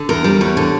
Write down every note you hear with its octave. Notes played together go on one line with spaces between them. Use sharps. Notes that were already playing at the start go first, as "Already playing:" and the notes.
Already playing: D3
E2 A#4
G3
E2 C#5
D3